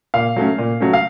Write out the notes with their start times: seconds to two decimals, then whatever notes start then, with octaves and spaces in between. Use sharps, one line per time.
0.14 A#2 F5
0.36 F#3 A3 C#4
0.58 A#2
0.80 F#3 A3 C#4
0.93 F5